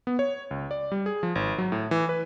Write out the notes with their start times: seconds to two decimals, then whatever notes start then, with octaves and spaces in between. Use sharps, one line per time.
0.07 B3
0.19 C#5
0.51 C#2
0.71 D5
0.92 G3
1.06 G#4
1.23 F3
1.35 G#1
1.58 F#3
1.72 A2
1.91 E3
2.09 B4